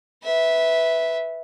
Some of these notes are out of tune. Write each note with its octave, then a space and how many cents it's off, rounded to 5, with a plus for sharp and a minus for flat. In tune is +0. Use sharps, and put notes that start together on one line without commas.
B4 +0 E5 -10